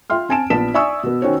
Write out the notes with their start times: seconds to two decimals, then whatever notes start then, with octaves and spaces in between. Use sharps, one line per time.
0.10 F4 E5 G5 C6 F6
0.29 C4 G#5 A5 D7 E7
0.50 A#1 B3 A5 B6 E7
0.74 D5 E5 G#5 C#6 D#6 E6
1.03 B2 B3
1.22 D#3 C#4 F#4 C5 C#5